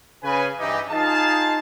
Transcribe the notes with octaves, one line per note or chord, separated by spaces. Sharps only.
C#3 B4 G#5
G2 E3 D#4 G4
D#4 F4 G#4 D#5 F5 A5